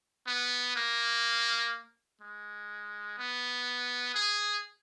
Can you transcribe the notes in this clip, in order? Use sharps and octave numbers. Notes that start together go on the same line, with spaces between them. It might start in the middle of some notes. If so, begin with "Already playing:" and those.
B3
A#3
G#3
B3
G#4